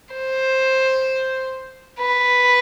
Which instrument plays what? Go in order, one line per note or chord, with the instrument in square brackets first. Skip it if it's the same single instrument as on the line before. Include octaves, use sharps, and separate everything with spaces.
[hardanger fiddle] C5
B4